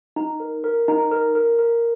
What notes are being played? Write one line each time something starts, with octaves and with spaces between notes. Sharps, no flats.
D#4
A#4
A#4
D#4
A#4
A#4
A#4